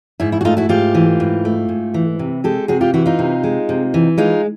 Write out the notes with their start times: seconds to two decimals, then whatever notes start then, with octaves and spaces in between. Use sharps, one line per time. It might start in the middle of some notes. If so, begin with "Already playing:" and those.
0.20 G#2 E4
0.32 E4
0.41 F#4
0.45 A3 D#4 F4
0.57 E4 F#4
0.69 G#2 F4 G4
0.95 E3
1.20 G#2
1.45 A3
1.69 G#2
1.94 E3
2.19 C3
2.44 G#3 G4 A4
2.68 C3 F#4 G#4
2.81 F4 G4
2.94 E3 E4 F#4
3.06 D#4 F4
3.19 C3
3.44 G#3
3.69 C3
3.94 E3
4.18 G#3 D#4 F4